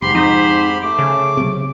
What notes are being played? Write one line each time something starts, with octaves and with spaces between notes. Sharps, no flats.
F1 G#2 G4 B5 C6
F2 D#4 C5
A3 D6
C#3
B1 C3